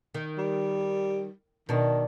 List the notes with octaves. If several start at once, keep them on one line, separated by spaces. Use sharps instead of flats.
D#3
G3
B2 D#3 D4